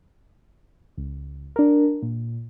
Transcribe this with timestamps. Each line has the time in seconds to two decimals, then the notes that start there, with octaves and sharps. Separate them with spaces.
0.98 C#2
1.56 D4 A#4
2.02 A#2